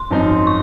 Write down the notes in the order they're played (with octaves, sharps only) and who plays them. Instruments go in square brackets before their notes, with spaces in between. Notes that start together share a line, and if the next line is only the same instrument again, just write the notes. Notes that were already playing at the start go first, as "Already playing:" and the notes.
Already playing: [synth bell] C6
[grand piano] G#1 F#2 F3 C4 D#4
[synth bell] C#6